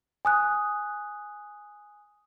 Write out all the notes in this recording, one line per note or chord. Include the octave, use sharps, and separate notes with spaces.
G#5 D#6 F#6